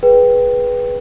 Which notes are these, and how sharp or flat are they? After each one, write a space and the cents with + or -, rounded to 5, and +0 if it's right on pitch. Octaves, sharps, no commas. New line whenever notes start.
G#4 +0 B4 -10 G5 +0